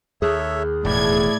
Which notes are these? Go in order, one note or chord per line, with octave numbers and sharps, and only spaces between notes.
D#2 G#4 A4 C#5 E5
E1 D#2 A2 E4 D5 G#6